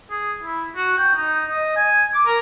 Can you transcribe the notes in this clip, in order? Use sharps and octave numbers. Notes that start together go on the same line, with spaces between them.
G#4
E4
F#4
G5
D#4
D#5
G#5
D6
A#4